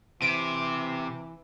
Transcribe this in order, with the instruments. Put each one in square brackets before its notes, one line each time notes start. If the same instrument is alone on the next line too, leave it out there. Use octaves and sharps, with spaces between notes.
[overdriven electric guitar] C3 [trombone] E3 [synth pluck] D7